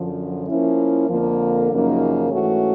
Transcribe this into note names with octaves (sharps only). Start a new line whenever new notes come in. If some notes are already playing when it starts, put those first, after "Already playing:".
Already playing: F#2 D3 F3
F3 A#3 C#4 E4
F2 D3 F3 A#3
F#2 C#3 F3 A#3 D#4
G#2 E3 A3 C#4 F#4